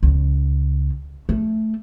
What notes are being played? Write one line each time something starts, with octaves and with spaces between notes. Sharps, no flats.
C#2
A3